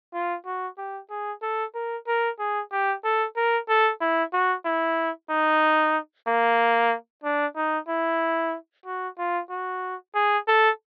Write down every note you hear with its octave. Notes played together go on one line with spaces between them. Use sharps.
F4
F#4
G4
G#4
A4
A#4
A#4
G#4
G4
A4
A#4
A4
E4
F#4
E4
D#4
A#3
D4
D#4
E4
F#4
F4
F#4
G#4
A4